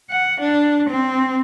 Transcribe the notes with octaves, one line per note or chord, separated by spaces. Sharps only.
F#5
D4
C4